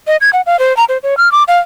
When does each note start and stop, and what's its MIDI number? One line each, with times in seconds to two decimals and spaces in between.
0.07 0.17 75
0.21 0.30 92
0.33 0.41 78
0.46 0.59 77
0.59 0.75 72
0.77 0.84 82
0.89 0.98 72
1.03 1.17 73
1.17 1.31 89
1.32 1.43 86
1.48 1.59 77